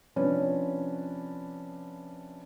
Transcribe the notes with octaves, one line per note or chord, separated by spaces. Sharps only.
C3 F3 C#4 D4 B4